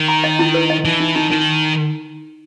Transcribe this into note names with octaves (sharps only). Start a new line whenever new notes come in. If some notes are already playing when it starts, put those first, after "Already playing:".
Already playing: D#3
A#5
D#5
E4
B4
D#5
E3 D#4
D#4
D#3 D#4
D#3 D#4